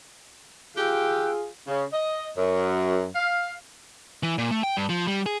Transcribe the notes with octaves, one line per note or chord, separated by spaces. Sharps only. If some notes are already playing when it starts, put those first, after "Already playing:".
F4 G4 G#4 G5 E6 F#6
C#3
D#5
F#2
F5
E3
A#2
A3
G5
G2
F3
G3
G#4